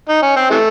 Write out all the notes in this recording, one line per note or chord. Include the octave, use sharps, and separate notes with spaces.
D#4
C#4
C4
C3 E3 A3